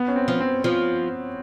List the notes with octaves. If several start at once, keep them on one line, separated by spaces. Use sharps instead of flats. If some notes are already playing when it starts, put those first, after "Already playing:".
Already playing: B3
C#4
C4
F3
C4
F3